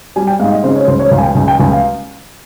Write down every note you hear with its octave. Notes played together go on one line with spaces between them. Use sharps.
G3 G#5
G5
G#2 F5
D#5
C#3 C5
C#5
C#2 C5
C#5
C#2 F5
G#5
G5
C#2 G#5
G5
C#2 G#5
F5